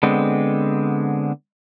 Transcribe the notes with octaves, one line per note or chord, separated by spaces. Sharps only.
D3 G#3 B3 C4